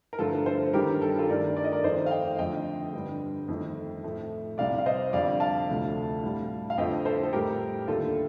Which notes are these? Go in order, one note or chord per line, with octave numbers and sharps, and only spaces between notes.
A#4
G2 D3 F3 A3 F4 A4
A4 C5
G2 D#3 G3 G4 A#4
A4
A#4
F4 A4
G2 D#3 A3 A#4 D5
D5
D#5
A#4 D5
F2 D#3 A3 C5 D#5
F5
D#5 G5
F2 D3 F3 A3 D#5 G5
G2 D3 G3
F2 D#3 A3
A2 F3 A3
C2 C3 G3 D5 F5
F5
C5 D#5
F2 D3 G3 D5 F5
F5 A5
D2 C3 F3 A3
A2 G3
F5
F2 D3 F3 A3 D#5 G5
A4 C5
A4
A2 G3 G4 A#4
D#2 D3 A3 F4 A4